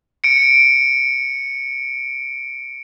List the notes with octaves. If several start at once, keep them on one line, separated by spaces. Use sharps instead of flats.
C#7 D7